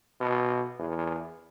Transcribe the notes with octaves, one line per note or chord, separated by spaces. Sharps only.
B2
E2